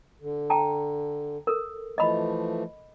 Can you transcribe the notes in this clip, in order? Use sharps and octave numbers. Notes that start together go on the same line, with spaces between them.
D3
G5 A5 A#5
A4 A#4
E3 F3 A3 D#5 B5